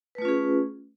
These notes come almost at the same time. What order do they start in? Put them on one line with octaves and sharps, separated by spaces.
B4 A3 F4 C#4 G#4